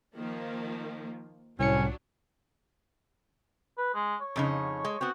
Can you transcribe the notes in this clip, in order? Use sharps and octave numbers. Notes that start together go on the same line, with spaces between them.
D#3 F3 A#3
C2 A2 F#3 C#4 D4 C#7
B4
G#3
C#5
F2 C#3 D#4
G#3
B3 C4 F#4